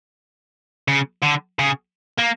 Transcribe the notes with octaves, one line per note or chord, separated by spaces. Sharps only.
C#3
D3
C#3
A#3